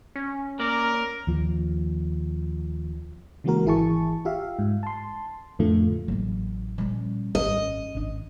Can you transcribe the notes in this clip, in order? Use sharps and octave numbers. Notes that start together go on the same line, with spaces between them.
C#4
A#3 A#4 D5
D#2 F3
C#3 E3 G#3 A#3 F#4 A#4
G#1 E3 E4 G#4 A5 C#6
F4 G4 E5 F5
G#2
A5 C6
F2 A2 D3 A3 F4
A1 E3 F#3 A#3
A#2 F3 G3 C#4
G#1 F#2 C#4 D#5
G#1 D4